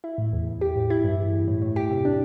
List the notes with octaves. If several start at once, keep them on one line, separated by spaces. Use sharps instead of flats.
E4
A2
E2
E2
G4
A2
E4
G2
E2
E2
A2
A2
G4
C3
D4